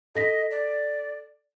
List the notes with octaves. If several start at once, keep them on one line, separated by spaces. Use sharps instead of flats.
A4 D#5 A#6 B6
D5